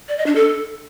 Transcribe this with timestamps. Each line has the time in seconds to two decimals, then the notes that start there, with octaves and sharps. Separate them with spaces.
0.09 D5
0.18 D#5
0.26 D4
0.35 A4